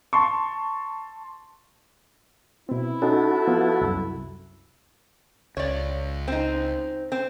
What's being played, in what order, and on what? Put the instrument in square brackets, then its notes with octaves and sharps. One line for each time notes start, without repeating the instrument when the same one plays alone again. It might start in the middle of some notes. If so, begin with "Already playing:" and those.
[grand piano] A5 C6 C#6
[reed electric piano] B2 C4 [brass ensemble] E4
[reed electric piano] C#4 D#4 [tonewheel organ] F#4 A4
[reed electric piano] F3 B3 F4
C2 F#2
[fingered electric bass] C#2 [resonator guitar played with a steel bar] C#5 D5
[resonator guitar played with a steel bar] C4 D#4
C4